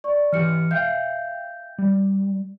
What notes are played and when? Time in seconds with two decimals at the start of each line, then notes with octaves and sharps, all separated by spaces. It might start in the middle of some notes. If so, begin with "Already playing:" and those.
0.04 D5 C#6
0.32 E3 G4 F6 C#7
0.71 E5 F5 G5 G6
1.79 G3